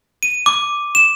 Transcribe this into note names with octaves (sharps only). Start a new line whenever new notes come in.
D#7
D6
E7